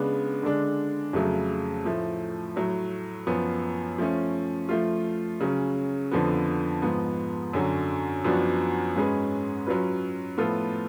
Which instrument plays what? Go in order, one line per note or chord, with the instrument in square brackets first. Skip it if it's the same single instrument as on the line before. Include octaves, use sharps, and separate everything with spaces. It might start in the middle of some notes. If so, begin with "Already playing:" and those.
Already playing: [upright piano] C#3 G#3 B3 D4
D3 G#3 D4
F2 C#3 F#3 A3
A2 F3 A3
A2 F#3 A3
F#2 F3 B3
F3 A3 C#4
F3 A3 F4
C#3 F#3 C#4
F2 D3 F3 B3
G#2 F3 B3
F#2 D3 F#3 C#4 F#4
F#2 F3 B3 D4 F#4
G#2 G#3 C#4 G#4 B4
F#3 C#4 F4 B4
A2 F3 B3 F4 A4